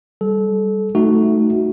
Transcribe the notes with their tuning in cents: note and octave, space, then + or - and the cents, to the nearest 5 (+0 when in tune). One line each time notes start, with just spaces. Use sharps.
G3 +0 A4 -25
A3 +0 D#4 +0 F#4 +0